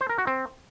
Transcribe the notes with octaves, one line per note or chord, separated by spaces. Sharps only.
C5
A#4
F#4
C4